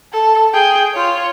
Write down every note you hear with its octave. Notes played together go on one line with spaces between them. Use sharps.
A4
G#4 G5
F4 C#5